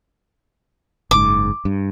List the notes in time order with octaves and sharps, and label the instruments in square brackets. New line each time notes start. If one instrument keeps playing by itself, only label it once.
[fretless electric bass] F#1 G#2 [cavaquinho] D6
[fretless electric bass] G2